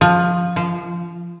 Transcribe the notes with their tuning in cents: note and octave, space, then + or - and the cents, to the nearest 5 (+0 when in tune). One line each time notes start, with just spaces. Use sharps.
F3 +10
F3 -25